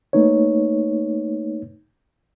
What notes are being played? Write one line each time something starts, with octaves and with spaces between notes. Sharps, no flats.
A3 A#3 D#4 B4 C#5